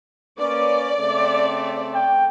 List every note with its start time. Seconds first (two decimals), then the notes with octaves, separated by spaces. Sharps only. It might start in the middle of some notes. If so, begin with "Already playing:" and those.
0.38 A#3 C#4 B4 D5
0.99 C#3 A3 C4
1.95 G5